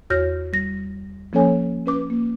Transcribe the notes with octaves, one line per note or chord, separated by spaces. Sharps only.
E2 F#4 C#5 F6 G6 A#6
G3 A#6
F3 A#3 C#4 A4 C#5 G#5
C#4 B4 D6
A#3